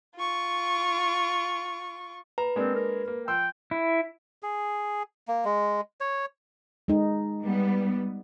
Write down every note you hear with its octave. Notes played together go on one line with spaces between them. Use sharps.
F4 C#6
B4 A#5
G#3 A#3 C4 D4
A#4
A#3
F3 G5 C6 E6
E4
G#4
A#3
G#3
C#5
G#3 D#4
G3 B3